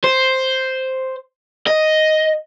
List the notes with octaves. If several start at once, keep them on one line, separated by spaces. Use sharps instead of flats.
C5
D#5